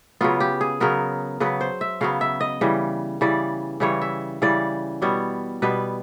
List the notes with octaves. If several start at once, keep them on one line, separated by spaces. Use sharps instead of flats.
C#3 F#3 B3 F4
G4
G#4
C#3 F#3 B3 A#4
C#3 F#3 B3 B4
C5
E5
C#3 F#3 B3 F5
E5
D#5
C#3 E3 G3
C#3 E3 G3 D5
C#3 E3 G3 C#5
E5
C#3 E3 G3 D5
B2 G3 B3 C#5
B2 G3 B3 B4